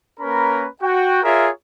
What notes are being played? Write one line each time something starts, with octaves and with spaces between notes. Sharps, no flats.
A#3 C#4 A#4 B4 A#5 B5
F#4 G5
F4 G#4 A#4 C#5 E5